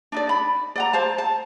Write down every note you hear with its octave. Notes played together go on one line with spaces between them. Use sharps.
D4 D#4 D5
B5
D5 F#5 A#5
C5 F5 A5
A5